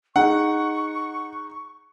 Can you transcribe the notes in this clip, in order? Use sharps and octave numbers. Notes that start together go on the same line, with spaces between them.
D#4 G#4 F#5 C#6